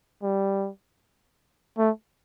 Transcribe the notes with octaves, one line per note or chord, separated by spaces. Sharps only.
G3
A3